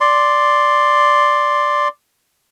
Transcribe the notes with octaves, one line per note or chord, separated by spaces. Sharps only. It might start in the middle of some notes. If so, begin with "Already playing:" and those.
D5 C6